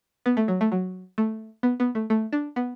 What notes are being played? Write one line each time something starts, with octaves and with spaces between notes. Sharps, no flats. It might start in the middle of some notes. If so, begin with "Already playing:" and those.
B3
A3
F#3
A3
F#3
A3
B3
B3
A3
A3
D4
B3